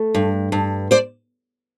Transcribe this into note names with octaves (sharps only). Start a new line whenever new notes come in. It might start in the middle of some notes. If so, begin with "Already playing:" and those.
Already playing: A3
G2
G2
C5 D5